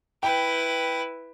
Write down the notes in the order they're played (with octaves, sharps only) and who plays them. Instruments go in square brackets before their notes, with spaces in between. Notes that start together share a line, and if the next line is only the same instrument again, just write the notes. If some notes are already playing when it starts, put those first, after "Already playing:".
[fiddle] E4 B4 [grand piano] G5